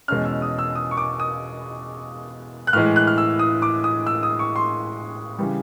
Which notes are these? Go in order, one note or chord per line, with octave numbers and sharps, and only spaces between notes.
E2 B2 G#3 C#4 F6
E6
D#6
E6
D#6
C#6
D6
D#6
F#6
A2 E3 G#3 F6
F#6
F6
E6
D#6
D6
D#6
E6
D#6
C#6
C6
C#3 E3 G3